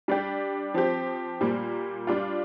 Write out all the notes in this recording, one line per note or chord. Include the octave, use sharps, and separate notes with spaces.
G3 D4 G4
F3 C4 G4
A#2 G3 A#3
G3 D4 F4